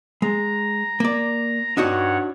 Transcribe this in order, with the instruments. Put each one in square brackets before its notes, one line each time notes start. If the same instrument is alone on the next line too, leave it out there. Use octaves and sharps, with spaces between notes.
[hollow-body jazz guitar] G#3 [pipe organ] A#5
[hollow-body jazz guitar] A#3 D5
[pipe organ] G2 C#5 F#5 [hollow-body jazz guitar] D4 D#4 F#4